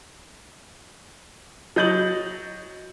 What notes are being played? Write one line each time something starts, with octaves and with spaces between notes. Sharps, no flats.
F#3 D#5 G6 A6 F#7